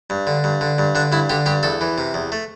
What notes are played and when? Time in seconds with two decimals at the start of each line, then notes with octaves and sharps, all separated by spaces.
0.10 G2
0.27 D3
0.44 G2
0.61 D3
0.78 G2
0.95 D3 D4
1.12 G2 E4
1.30 D3 G4
1.46 G2 G4
1.63 E2 A4
1.81 E3
1.98 C3
2.14 E2
2.32 A3